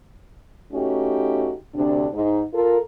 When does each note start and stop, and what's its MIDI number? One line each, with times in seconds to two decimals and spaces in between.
0.73 1.53 57
0.73 1.53 61
0.73 1.53 63
0.73 1.53 66
0.73 1.53 67
1.75 2.07 38
1.75 2.07 48
1.75 2.07 62
2.14 2.42 44
2.14 2.42 63
2.54 2.77 65
2.54 2.77 69
2.54 2.77 70